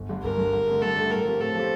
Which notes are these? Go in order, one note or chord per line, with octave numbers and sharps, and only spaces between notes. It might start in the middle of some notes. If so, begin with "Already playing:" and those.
Already playing: G1
G2 D3
G1 A#4
G2 D3
G2
D3 A3
G2 A4
D3 A3
A2 A#4
F3 C4 G4
A2 A4
F3 C4 G4